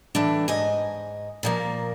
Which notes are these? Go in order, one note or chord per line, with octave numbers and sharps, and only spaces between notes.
A2 E3 D4
G#2 D#5 G#5
A#2 F3 A#3